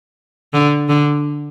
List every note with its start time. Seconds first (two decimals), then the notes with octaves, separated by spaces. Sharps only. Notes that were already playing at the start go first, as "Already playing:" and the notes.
0.53 D3
0.89 D3